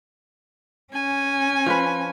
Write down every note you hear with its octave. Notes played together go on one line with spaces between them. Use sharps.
C#4 G#5
F3 F4 B4